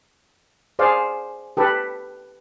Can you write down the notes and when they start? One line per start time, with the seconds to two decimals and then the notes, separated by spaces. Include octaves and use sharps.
0.79 G#4 C5 D5 F5
1.57 G4 A4 B4